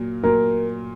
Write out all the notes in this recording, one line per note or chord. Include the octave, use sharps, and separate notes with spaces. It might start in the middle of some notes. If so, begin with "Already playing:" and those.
Already playing: A#2 F#3 A#3
A#2 F#3 A#3 A#4